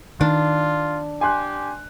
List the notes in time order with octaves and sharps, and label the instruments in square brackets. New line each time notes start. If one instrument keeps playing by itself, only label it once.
[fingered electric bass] D#3 [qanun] D4 [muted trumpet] F4
[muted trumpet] G4 [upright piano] G#5 C6 F#6